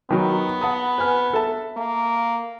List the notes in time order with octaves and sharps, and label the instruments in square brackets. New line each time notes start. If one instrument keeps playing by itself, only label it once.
[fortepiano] D#3 F#3 [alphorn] B3
[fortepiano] F#5 A5 D#6
B4 G#5 F6
A4 E5 A5
[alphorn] A#3